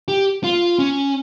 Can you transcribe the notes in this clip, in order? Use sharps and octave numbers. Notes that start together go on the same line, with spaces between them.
G4
F4
C#4